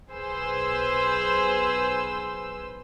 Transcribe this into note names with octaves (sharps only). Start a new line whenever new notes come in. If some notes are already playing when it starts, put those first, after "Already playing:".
B1 G#4 B4 C5 E6